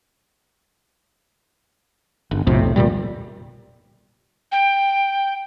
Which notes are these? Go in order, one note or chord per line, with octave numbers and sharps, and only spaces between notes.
G1
B1 F2 A2 C3
F1 D2 A#2 G3
G5